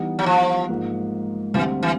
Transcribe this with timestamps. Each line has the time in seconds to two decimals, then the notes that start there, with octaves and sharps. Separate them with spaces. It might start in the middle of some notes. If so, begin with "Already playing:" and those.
Already playing: E3 G3 B3 D#4
0.19 F#3
0.26 F3
0.69 G#2 F3 A#3 D#4
1.54 D2 D3 E3 G3 C4
1.83 E3